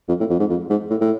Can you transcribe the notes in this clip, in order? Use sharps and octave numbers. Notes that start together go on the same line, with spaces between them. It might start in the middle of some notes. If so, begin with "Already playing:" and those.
F2
A2
F2
G#2
F2
G#2
A2
A2